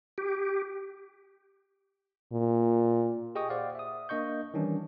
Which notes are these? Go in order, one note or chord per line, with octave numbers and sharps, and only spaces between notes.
G4
A#2
G4 G#4 D#5 G5 C#6 D#6
C5 D5 F5 F#5
E5 D#6
A#3 D4 D#5 C#6 G6
D#3 E3 G3 C#4 D4